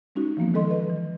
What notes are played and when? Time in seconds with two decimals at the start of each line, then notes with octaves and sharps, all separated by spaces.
0.15 G#3 C#4 D#4 F#4
0.37 E3 F3 A#3 B3
0.54 D#3 G#3 A4 D#5 C6
0.70 B4 D#5
0.90 E3